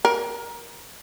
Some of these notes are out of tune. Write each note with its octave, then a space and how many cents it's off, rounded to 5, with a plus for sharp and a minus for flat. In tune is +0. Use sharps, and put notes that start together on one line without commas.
A#4 +20